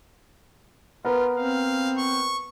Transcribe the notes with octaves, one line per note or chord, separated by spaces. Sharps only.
B3 F4 A#4 B4
C4 F5
C#6